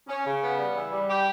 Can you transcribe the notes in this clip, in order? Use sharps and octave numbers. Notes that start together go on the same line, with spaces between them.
C#4
C#3
B3
G3
E3
G3
G4